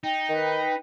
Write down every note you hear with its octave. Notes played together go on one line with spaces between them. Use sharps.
D#4 G5
D#3 B4